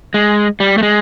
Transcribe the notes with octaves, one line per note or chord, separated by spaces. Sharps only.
G#3
G3
A3
G#3